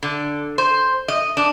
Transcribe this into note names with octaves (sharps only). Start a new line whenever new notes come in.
D3
C5
D#5
D4